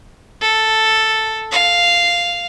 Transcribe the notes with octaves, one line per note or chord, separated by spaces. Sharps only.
A4
F5